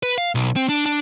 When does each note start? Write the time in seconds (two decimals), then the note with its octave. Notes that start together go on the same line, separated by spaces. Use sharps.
0.03 B4
0.18 F5
0.35 B1
0.56 C4
0.69 D4
0.86 D4